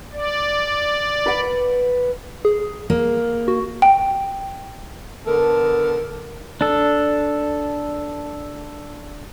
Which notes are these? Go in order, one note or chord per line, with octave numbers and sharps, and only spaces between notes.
D5
B4 F#5
G#4
A#3
F#4
G5
D3 B3 A4 A#4
D4 A4